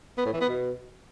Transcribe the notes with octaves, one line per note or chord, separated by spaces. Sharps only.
B3
A2
E3
B3
B2